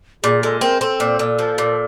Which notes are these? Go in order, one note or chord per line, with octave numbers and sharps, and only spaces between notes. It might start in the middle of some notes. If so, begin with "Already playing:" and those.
A#2 G#4
G#3 A4
C4 A#4
C4 A4
A#2
A#2
F3
A#2